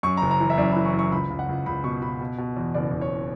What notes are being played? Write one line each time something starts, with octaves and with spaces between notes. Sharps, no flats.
F#2 C#6
A#5
F#1
A#5
E3
E5
F#2 D5
B5
E3
C#6
F#2
C#6
C#2 B5
C#2
F#5
C#2
C#2 B5
B2 C#6
B2 B5
B2
B2
E2
F#1 D5
F#1
C#5